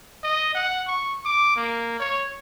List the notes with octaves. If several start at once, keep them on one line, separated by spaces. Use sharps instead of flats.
D#5
F#5
C#6
D6
A#3
C#5